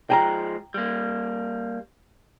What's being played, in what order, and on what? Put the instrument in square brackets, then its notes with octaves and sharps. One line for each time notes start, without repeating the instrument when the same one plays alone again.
[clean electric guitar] F3 G#3 [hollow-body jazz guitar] G5 G#5 A#5
[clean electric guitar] G3 A#3